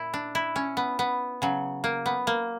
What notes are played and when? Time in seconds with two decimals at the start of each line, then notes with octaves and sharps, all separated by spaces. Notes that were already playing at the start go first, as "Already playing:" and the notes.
Already playing: A#2 E4
0.14 D4
0.35 E4
0.56 C#4
0.77 B3
0.99 B3
1.42 C#3 F#3
1.84 A#3
2.06 B3
2.27 A#3